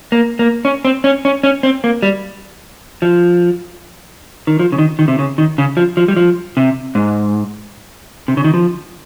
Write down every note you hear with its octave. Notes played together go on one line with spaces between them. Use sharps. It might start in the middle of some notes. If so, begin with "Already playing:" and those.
A#3
A#3
C#4
C4
C#4
C#4
C#4
C4
A#3
G3
F3
D#3
F3
C#3
D#3
D#3
C3
C#3
D#3
C#3
F3
F3
G3
F3
C3
G#2
C3
C#3
D#3
F3